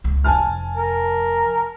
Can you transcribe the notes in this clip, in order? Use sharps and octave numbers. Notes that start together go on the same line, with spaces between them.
C#2
F1 F2 G#5 A5 F6
A#4